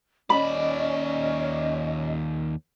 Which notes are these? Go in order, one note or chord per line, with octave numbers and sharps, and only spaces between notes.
D#2 C#4 D5 D#5 B5